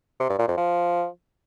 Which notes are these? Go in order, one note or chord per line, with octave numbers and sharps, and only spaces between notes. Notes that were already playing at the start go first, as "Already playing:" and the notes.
C3
G2
A#2
F2
F3